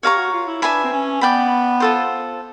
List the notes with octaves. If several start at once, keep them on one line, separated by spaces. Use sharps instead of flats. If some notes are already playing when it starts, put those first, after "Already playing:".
G4 C#5 F5 A#5 C#6
F#4
F4
E4
D4 B4 E5 G#5 B5
C4
C#4
B3 D5 G5 B5
F4 A4 C5